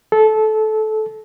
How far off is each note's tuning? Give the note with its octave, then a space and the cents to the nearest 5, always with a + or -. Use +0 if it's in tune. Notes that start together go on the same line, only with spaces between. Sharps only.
A4 -20